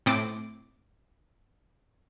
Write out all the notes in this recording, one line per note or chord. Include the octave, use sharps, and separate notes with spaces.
A2 C4 D6